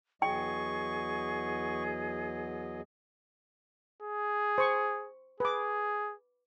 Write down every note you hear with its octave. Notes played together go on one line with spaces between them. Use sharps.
E2 F#3 G#4 D#5 G5 C#6
G#4
C5 C#6
G#4 B4 D6